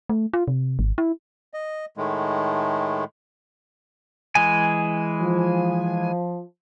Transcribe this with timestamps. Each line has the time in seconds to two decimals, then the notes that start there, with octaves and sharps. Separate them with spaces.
0.09 A3
0.33 F4
0.48 C3
0.79 G#1
0.98 E4
1.54 D#5
1.97 A2 D#3 G#3 A3
4.35 E3 G#3 G#5
5.21 F3